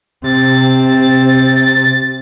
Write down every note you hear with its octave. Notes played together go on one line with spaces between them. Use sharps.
C3 C4 A6